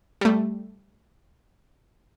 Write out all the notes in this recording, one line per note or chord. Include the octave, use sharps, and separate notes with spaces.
G3 A3